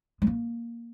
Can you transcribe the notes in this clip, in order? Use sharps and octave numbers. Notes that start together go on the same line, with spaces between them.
G#3
A#3